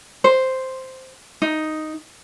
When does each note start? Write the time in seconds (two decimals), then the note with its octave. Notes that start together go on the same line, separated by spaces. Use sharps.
0.24 C5
1.42 D#4